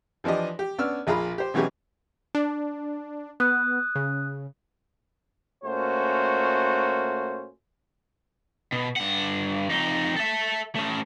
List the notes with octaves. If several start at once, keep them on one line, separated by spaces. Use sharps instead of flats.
E3 F3 D4 G4 D#5
G4
B3 C#4 D4 E6 F6
A#1 F4 G#4 A#5 B5
G4 C5
B2 E3 F#3 C#4 G4 G#4
D4
B3 D#6 F#6
C#3
A#2 A3 C#4 F#4 C5
B2
G2 F#5
F2 D#4
A4 E5
A3 C#4